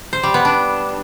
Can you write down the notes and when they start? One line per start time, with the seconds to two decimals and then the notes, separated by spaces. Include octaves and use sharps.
0.13 C5
0.23 G3
0.34 B3
0.45 D4